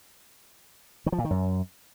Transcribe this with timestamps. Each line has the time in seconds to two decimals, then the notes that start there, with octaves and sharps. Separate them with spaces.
1.06 D#3
1.12 F3
1.18 A#2
1.24 D#3
1.31 F#2